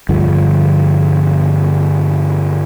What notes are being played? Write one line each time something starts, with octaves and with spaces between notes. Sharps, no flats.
G2 D3 F3